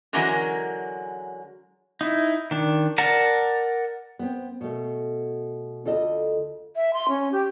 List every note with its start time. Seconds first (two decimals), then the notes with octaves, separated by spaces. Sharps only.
0.13 D3 E3 F#3 G#3 C#4 A#4
2.01 D#4 E4
2.51 D#3 D4
2.98 A#4 D5 F#5 A5 A#5
4.19 B3 C4
4.61 B2 A3
5.85 D2 F4 A4 D#5
6.76 E5
6.94 C6
7.09 C#4
7.32 G4